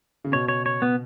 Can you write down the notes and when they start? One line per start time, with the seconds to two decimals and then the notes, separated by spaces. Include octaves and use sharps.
0.24 C#3
0.32 B2 C#5
0.48 C#5
0.66 C#5
0.82 B3